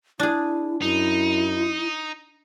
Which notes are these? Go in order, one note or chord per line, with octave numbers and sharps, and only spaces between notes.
D4 E4 G#4
F#2 D#4 E4